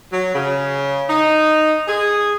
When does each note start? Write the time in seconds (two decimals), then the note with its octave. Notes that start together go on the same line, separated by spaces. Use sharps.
0.12 F#3
0.34 C#3
1.09 D#4
1.88 G#4